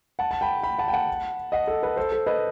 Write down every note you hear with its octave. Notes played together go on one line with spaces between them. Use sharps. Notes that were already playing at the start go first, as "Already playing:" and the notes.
F#5 A5
A5
G5 B5
G5 B5
F#5 A5
G5
F#5 A5
D#5 F#5
A4
B4
A4 C5
A4 C5
B4 D#5